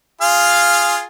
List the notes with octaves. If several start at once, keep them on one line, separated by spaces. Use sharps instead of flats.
F4 G#4 F5